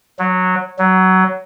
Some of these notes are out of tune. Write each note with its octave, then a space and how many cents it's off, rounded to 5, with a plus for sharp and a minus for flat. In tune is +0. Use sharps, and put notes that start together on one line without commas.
F#3 -10
F#3 +15